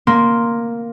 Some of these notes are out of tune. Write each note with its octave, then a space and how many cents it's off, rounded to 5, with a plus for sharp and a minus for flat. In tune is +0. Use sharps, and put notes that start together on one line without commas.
A#3 +0 C6 +0